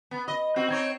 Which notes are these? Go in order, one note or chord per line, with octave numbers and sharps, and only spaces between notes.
B3
D#5
C4 F#4
C4 D#4 C#5